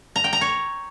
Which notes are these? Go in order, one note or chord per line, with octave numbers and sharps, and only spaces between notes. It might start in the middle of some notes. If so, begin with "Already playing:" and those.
A#5
G5
A#5
C#5